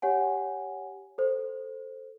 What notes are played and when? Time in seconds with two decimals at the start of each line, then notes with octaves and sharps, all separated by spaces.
0.02 G4 C#5 F#5 G#5
1.18 A4 C5